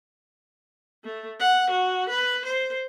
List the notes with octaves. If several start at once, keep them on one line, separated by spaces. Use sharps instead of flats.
A3
F#5
F#4
B4
C5